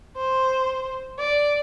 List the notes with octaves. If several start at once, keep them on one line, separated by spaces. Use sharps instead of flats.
C5
D5